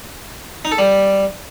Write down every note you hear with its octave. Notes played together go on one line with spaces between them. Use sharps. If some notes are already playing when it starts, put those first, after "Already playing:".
D#4
A4
G3